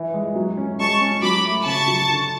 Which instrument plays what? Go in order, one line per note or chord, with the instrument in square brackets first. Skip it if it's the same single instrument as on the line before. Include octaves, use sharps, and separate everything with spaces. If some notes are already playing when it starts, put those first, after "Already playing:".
Already playing: [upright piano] E3
G#3
F#3
C#4
[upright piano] G#3 [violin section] A5 C#6
[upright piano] C#4
[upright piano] F#3 [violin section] B5 D6
[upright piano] A3
[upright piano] C#3 [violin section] A5 C#6
[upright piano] F#3
D3